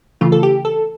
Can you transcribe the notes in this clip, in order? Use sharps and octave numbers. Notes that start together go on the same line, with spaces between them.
C#3 E3 A3 F4
A4
G4
A4